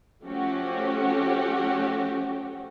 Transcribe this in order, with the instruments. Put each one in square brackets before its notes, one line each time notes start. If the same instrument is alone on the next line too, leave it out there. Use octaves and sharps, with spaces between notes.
[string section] F3 A3 C#4 F#4 G4